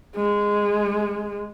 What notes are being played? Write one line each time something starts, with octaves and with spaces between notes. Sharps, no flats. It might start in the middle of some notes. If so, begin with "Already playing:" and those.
G#3